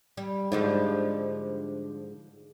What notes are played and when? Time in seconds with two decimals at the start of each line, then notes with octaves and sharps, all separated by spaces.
0.17 G3
0.52 G#2 D3 F3 G3